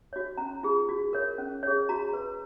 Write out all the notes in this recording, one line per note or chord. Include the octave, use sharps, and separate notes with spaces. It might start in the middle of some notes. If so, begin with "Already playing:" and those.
F#4 C#5
C#4 A#5
F4 G#4
F#4
A#4 C#5
C#4
G#4 C#5
F#4 A#5
B4